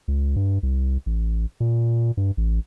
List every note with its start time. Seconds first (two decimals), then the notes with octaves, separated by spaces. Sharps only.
0.08 C#2
0.36 G2
0.63 C2
1.06 A1
1.60 A#2
2.17 G2
2.37 A1